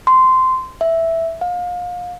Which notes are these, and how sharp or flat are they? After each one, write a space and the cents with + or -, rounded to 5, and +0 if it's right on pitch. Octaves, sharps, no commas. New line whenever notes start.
C6 -15
E5 +0
F5 +30